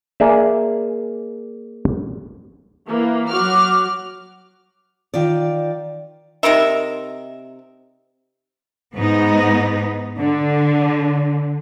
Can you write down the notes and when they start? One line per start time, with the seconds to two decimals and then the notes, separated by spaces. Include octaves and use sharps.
0.20 A#3 G#4 D5 E5
2.89 E3 A#3
3.30 F#3 F#4 D6 F6
5.14 D#3 F4 D5
6.43 C3 D#4 A#4 E5
8.94 G#2 B3 D#4
10.19 D3